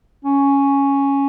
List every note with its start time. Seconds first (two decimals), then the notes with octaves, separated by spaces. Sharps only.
0.24 C#4